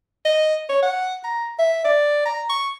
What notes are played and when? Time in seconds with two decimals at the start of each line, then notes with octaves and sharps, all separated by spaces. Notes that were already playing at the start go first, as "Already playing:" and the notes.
0.25 D#5
0.69 C#5
0.82 F#5
1.24 A#5
1.59 E5
1.85 D5
2.26 A#5
2.49 C#6